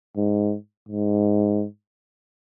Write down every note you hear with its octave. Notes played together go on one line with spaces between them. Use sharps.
G#2
G#2